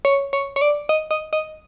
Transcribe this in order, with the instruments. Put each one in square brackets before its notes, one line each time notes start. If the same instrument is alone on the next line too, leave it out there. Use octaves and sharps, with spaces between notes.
[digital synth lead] C#5
C#5
C#5
D5
D#5
D#5
D#5